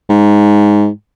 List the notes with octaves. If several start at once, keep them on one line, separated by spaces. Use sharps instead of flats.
G#2